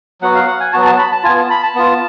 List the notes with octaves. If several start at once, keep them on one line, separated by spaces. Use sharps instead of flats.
F#3 B3 F#4 F#5
F5
F#5
G#5
F#3 B3 F#4 A5
A5
B5
A5
B3 F4 G#5
A5
B5
A5
B3 F4